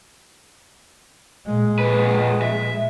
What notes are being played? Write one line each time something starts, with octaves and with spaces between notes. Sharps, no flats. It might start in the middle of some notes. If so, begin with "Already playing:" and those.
A#2 G#3
F2 B4
E5